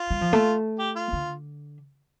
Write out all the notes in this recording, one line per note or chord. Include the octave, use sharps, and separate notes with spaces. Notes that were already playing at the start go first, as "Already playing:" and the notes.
Already playing: F4
G3
F3
A3
G4
F4
D3